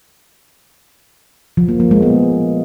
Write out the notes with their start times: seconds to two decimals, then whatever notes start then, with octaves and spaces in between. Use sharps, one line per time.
1.57 F3
1.69 A#3
1.80 A#3
1.91 G#3
2.02 B3